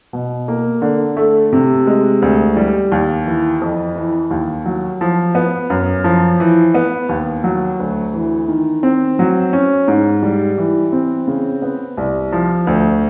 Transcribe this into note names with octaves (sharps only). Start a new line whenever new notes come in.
B2
A#3
D3
A3
C3
G#3
D2
G3
D#2
E3
F2
E3
D#2
F#3
F3
B3
F#2
F3
E3
B3
D#2
F#3
D2
E3
D#3
C4
F#3
C#4
G#2
G3
E3
C4
C#3
B3
C2
F3
D2